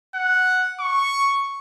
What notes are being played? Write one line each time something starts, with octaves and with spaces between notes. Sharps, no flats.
F#5
C#6